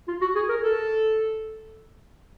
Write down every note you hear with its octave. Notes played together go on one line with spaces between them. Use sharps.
F4
F#4
G#4
A#4
A4